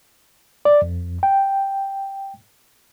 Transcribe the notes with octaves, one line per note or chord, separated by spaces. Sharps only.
D5
F2
G5